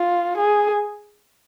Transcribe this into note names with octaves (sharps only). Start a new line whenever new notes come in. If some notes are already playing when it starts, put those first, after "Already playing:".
Already playing: F4
G#4